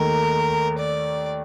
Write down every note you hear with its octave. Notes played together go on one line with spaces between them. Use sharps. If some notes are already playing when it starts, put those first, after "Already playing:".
Already playing: D#2 D#3 A3 A#4
D5